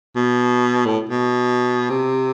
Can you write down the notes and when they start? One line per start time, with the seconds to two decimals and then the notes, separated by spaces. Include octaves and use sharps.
0.16 B2
0.85 A2
1.09 B2
1.90 C3